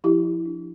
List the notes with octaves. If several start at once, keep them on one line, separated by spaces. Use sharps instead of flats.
F3 E4 G4
D4